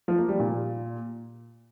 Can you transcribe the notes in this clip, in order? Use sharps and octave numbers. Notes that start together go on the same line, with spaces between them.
F3
A#3
G3
A#2